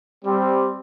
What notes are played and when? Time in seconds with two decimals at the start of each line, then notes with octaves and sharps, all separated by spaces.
0.25 G3 C4